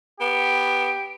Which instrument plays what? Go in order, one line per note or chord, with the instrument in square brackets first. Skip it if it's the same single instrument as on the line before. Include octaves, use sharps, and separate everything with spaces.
[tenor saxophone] B3 [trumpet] G4 [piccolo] D7